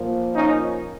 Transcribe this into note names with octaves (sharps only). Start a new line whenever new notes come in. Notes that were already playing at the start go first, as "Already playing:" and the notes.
Already playing: A#2 F3 A#3
C#4 D#4